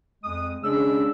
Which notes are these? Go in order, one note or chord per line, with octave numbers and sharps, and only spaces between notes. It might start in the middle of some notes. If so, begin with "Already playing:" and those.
F2 G#3 D#6
C#3 G#3 D4 E6